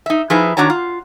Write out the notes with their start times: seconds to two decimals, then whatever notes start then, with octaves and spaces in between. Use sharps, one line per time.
0.06 D#4 E5
0.30 F3 D#4 E4 G#4 B4 E5
0.57 D#3 F3 D4 F#4 C#5 A#5
0.70 F4